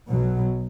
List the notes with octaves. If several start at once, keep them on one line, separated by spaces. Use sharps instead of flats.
B1 B2 F#3